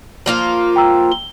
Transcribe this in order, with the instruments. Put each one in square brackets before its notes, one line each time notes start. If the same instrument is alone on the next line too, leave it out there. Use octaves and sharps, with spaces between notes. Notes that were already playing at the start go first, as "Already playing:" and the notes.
[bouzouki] F3 A#3 F4
[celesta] G5 A#5 E6
G7